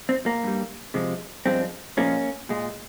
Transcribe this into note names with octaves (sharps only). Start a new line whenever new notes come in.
C4
A#3
G2 G3
C3 F3 G#3
G2 F3 G#3 C4
A#2 F3 G#3 A#3 C#4
A#2 G#3